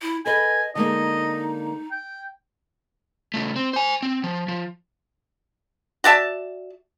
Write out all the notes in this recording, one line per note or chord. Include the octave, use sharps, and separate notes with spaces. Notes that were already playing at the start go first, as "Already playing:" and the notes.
E4
A4 B4 D#5 G#5
D3 G#3 A#3 D#4 D#5
G5
C#3 A3
C4
C5 G#5
C4
F3
F3
F#4 D5 E5 A5